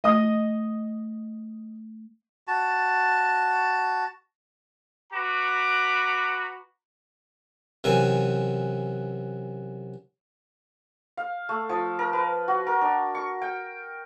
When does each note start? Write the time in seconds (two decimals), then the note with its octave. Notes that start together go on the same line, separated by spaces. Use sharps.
0.04 A3 D#5 D#6
2.47 F#4 A5
5.13 F#4 B4 A#5 B5 D6
7.84 F#2 C3 E3 G#5
11.17 F5
11.49 A3
11.69 F3
11.99 A#4
12.13 B4
12.48 F#4
12.67 A#4
12.81 D4
13.15 C#6
13.42 G5